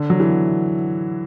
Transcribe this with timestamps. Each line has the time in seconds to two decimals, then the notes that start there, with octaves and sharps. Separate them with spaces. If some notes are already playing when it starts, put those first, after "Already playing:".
Already playing: D3
0.10 F#3
0.20 E3